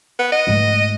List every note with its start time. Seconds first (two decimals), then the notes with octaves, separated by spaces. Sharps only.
0.19 B3
0.32 D#5
0.47 G#2 A3